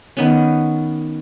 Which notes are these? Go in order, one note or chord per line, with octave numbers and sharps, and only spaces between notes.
D#3 B3 C#4